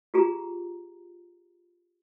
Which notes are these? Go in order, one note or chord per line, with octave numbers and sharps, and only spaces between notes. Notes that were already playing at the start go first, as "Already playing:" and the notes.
F4 G4 G#4 A#5